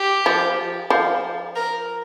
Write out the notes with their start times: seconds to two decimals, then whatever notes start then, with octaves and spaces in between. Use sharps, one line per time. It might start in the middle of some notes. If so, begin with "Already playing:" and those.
Already playing: G4
0.26 F3
0.90 F3
1.56 A#4